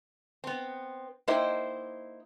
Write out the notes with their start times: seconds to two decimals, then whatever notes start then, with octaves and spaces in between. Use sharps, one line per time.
0.44 B3 C4
1.28 A#3 D#4 E4 C5 D#5 G5